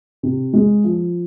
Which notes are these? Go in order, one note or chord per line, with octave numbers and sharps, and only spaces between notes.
C3
G#3
F3